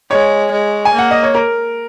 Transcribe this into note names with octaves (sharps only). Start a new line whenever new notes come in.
G#3 C#5
G#3
G#5
A#3
F#5
D#5
C#5
A#4